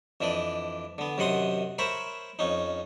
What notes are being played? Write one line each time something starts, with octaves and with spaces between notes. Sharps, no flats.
F2 E3 D4 D5 D#5
D3 B3
F#2 C3 D#3 F#5 C6 D#6
A#4 C5 C#5 E5 A#5 B5
F2 C#4 D#4